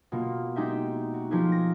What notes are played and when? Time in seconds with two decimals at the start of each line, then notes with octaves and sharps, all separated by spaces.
0.12 B2 A#3 F4
0.56 G#3 D#4 G4 E5
1.14 F#4
1.31 F3 D#4 F4 G4 G#4 B4
1.52 A#6